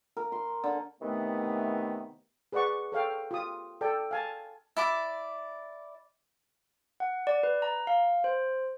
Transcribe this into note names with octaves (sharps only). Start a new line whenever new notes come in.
A#4
C6
D3
C3 D#3 E3 A3 B3
G#4 B4 D5 F#5 C#6
A4 C#5 F5 G5
F4 G4 D#6
A4 D5 G5
F5 G#5 A5
E4 D5 D6
F#5
D5
B4
A#5
F5
C5